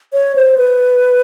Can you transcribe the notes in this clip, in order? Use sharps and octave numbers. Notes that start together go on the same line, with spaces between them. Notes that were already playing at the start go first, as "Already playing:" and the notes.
C#5
C5
B4